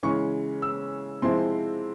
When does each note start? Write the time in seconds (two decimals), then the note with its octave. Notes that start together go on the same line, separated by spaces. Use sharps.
0.03 C#3 E3 G#3 C#4 C#6
0.62 E6
1.22 C3 F3 G#3 C4 E4 C6